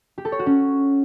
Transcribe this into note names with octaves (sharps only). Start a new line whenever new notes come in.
G4
A4
C#5
F#4
C#4